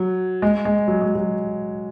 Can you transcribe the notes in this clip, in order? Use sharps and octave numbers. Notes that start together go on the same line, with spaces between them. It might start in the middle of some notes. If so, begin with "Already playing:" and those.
Already playing: F#3
G#3
G#3
F#3
G#3
F#3